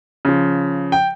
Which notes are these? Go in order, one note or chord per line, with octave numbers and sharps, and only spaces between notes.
C#3 F3
G5